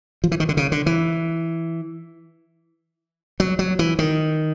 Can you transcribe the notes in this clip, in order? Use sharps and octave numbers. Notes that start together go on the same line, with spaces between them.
F3
E3
D#3
D3
C#3
D3
E3
F#3
F#3
E3
D#3